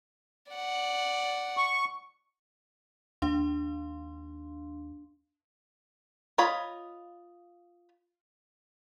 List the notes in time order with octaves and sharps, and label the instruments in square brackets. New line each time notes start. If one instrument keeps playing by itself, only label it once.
[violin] D5 F#5
[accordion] C#6
[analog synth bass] D#2 [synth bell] D4 F5 C6
[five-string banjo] F4 C#5 D#5 B5